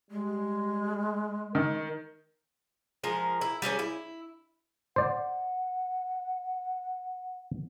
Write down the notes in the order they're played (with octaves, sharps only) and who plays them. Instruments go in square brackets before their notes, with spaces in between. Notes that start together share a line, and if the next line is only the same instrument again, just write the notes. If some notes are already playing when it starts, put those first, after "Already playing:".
[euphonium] G3 [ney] G#3
[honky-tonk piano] D#3 [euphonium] A#4
[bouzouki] F3 G#3 A#4
E4
G3 C#4 G#4 C#5
E4
[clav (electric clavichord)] C5 D5 [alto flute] F#5